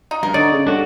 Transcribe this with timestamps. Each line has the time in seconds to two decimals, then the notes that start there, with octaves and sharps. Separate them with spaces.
0.11 D#4
0.23 G2 A#4
0.34 D3 D#4 C#5 D5
0.51 C#3
0.67 G2 D4 F#4 A4